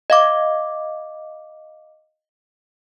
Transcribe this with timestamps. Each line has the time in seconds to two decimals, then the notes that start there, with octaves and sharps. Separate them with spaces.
0.10 D#5 F5 D6